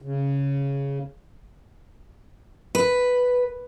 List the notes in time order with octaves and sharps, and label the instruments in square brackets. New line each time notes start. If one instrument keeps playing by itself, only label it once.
[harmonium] C#3
[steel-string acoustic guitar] B4